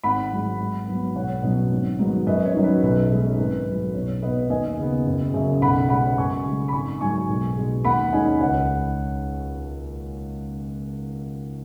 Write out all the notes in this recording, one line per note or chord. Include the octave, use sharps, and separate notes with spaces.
G#1 F#5 B5
G#2 F#3
G#2
F#3 B3
B1 C#5 F#5
B2 F#3 C#4
G#1
G#2 D#3 F#3 B3
F#2 B4 D#5
C#5
D#3 F#3 C#4
B4
B1 B4
B2 G#3 C#4
G#1
F#2 F#3
B1 C#5
B2 B3 B4 D#5
D#2 D#5 G#5
C#3 B3
F#1
F#2 C#3
B1 F#5 B5
B2 G#3 C#4 F#5 B5
F#2 G#5 C#6
C#3 G#3
B5
G#1 G#5 C#6
G#2 D#3 F#3 G#5 C#6
B1
B2 G#3
D#2 F#5 B5
D#3 G#3 C#4 D#5 G#5
C#2 C#5 F#5